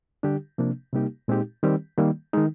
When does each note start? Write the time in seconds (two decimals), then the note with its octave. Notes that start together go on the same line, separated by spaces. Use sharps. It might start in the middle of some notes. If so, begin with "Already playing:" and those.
0.23 D3 G3 D4 G4
0.58 C3 F3 A#3 D4
0.93 C3 G3 A#3 D#4 G4
1.28 A#2 G#3 C4 D#4 G4
1.63 D#3 G3 C4 G4
1.97 D#3 G3 A#3
2.33 D#3 G#3 D#4